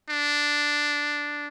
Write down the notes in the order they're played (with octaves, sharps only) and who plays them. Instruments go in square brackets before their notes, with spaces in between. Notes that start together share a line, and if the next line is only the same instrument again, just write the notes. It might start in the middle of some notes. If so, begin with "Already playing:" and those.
[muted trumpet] D4